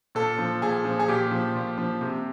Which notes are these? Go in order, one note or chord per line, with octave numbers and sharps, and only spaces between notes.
A#2 A4
F3
A#2 G#4
F3
G#4
A#2 G4
F3
A#2
F3
C3